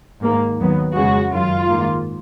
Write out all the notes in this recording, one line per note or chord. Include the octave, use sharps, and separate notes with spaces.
G#2 D#3 A#3
D#2 D#3 F#3 B3
F2 C#3 G#3 F#4
F#2 D#3 F#3 F4
G#2 D#3 A#3